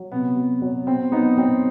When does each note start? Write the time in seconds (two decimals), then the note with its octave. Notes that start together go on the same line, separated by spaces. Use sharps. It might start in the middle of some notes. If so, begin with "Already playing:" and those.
Already playing: F#3
0.12 C3 B3
0.36 F#3
0.62 F#3
0.87 B2 C4
1.12 F#3 B3 D#4
1.37 F#3 C4